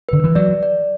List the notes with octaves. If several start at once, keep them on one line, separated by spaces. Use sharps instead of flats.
D3 B4
E3
F#3 D5
D5